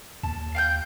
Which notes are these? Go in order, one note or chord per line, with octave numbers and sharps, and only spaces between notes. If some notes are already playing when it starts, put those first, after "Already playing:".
D#2 A5
F5 G5 G6